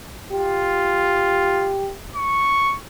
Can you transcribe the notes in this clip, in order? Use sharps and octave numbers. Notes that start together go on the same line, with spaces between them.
F4 G4
C#6